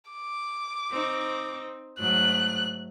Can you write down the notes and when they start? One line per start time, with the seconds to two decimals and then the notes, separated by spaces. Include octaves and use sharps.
0.11 D6
0.91 C4 D#4
1.99 G#2 F#3 A3 F#6